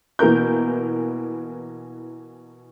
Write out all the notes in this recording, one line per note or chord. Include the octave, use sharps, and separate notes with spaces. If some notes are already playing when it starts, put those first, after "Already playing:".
B2 E3 A#3 A#4 G6